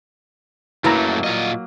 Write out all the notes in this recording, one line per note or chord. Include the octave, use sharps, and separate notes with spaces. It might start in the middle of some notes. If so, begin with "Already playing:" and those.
F#2 F#3 A3 A#3 E4 B4 A#5
A#2 F4 D#5